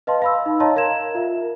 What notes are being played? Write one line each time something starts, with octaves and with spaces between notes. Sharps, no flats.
B4 D#5 F5 A5 C6
F5 B5 E6
D#4
C#5 D#5 F5 A5 A#5 C6
A#4 F5 G#6 E7
F4 A#4 E5